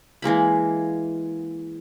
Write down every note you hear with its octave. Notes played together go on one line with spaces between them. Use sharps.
E3 G#3 A#3 B5